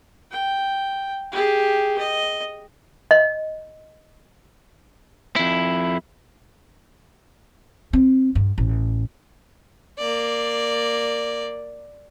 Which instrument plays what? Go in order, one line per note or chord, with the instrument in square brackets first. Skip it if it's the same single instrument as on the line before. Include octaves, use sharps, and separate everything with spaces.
[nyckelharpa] G5
G4 G#4
D#5
[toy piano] D#5
[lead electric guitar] F2 E4
[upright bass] C4
G2
A1
[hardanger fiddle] A#3 D5